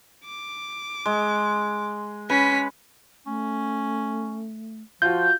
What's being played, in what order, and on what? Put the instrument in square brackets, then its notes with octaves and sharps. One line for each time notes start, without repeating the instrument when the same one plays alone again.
[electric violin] D6
[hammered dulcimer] G#3
[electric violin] C#4 B6 [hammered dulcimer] B4 B5
[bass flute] A3 [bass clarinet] C#4
[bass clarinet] F3 [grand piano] F4 F#4 [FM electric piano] G6